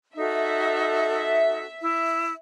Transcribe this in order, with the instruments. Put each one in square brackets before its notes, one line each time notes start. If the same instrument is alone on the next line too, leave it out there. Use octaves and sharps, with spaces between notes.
[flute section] D#4 F#4 A4 [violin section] E5
[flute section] E4